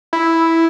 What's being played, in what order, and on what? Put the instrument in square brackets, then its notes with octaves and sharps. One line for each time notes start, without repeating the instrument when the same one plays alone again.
[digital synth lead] E4